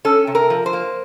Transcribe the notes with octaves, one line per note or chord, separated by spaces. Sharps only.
C#4 A4
C3
A#4
F3
C5
A#3